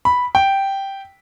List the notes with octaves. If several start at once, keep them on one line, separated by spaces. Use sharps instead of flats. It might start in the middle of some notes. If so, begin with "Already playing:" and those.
B5
G5